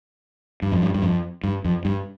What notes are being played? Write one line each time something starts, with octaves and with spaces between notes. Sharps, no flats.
G2
F2
G2
G2
F2
G2
F2
G2